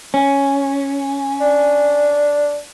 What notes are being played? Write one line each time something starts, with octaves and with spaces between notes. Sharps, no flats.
C#4
D4